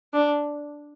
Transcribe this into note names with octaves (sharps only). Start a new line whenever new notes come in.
D4